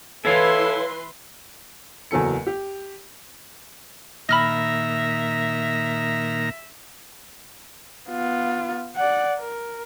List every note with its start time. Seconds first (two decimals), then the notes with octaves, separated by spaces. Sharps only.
0.25 E3 E4 A4 B4 C#5 F5 C6
2.11 F#1 E2 F#3 A4 C#7
2.47 G4
4.29 A#2 D#3 A#3 E5 A#5 B5 F6 A#6
8.10 B3 F4
8.96 D5 F#5
9.38 A#4